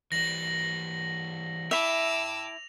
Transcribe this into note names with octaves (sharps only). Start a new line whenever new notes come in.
E3 G3 A#6 F#7
E4 E5 G5 A5 D6 E6 F7